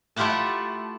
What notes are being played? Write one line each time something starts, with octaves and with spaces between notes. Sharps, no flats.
A3 E4 F4 G4 F#5 A5